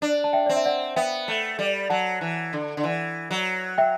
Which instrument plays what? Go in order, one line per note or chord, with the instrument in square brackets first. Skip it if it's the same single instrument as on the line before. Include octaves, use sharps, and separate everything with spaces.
[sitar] D4
[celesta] A5
E5 G5
[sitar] C4 [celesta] D5
[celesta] E5
D5 F#5
[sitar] B3 [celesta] E5 G5
[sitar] A3
G3
[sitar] F#3 [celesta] F#5 A5
[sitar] E3
D3
D3
E3
F#3
[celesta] E5 G5